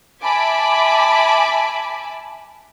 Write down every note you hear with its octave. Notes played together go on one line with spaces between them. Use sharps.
E5 G#5 A5 B5 D6